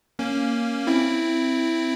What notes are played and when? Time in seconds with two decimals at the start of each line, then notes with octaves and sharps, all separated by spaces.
0.19 A#3 C#4
0.87 C4 E4